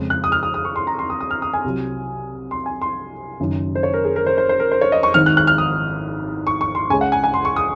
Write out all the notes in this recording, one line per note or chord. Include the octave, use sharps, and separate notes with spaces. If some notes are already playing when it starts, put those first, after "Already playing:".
Already playing: F2 C#3 G#3
F#6
D#6
F6
D#6
D#6
C#6
C6
A#5
C6
D#6
D#6
F6
D#6
G#5
C2 C3 F#3
C6
G#5
C6
F#1 F#2 D#3
C5
C#5
A#4
G#4
A#4
C5
C5
C5
A#4
C5
C#5
D#5
C#6
G#1 G#2 D#3 F6
F#6
F#6
F6
D#6
C#6
C#6
C6
C#2 C#3 G#3 G#5
F#5
G#5
G#5
C6
C#6
D#6